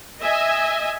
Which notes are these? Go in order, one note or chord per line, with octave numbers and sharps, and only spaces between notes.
D#5 E5 G#5